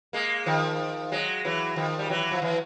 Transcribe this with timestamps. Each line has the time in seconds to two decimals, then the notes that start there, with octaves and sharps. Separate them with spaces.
0.13 G#3 A#3
0.46 D#3 F3
1.12 F#3 G#3
1.45 E3 F#3
1.76 D#3 F3
1.99 G3
2.10 E3 F#3
2.32 F3
2.42 E3 F#3